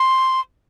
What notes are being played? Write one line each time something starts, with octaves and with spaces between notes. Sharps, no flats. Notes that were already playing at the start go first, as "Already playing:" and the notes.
Already playing: C6